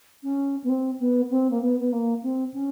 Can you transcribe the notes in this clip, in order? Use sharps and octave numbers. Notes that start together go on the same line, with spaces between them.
C#4
B3
C4
B3
C4
A#3
B3
B3
A#3
C4
C#4